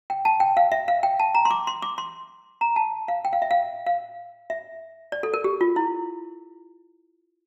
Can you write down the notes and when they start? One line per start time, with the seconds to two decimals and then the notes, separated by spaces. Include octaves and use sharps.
0.10 G5
0.25 A5
0.40 G5
0.57 F5
0.72 E5
0.88 F5
1.03 G5
1.20 A5
1.35 A#5
1.45 C6
1.51 D6
1.67 C6
1.82 D6
1.98 C6
2.61 A#5
2.76 A5
3.08 F5
3.25 G5
3.33 F5
3.42 E5
3.51 F5
3.86 F5
4.50 E5
5.12 D5
5.23 A4
5.34 A#4
5.44 G4
5.61 F4
5.76 E4